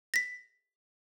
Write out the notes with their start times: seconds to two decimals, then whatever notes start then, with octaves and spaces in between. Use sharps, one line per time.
0.14 A#6 B6